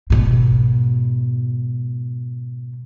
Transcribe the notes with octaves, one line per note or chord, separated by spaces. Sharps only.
G#2 B2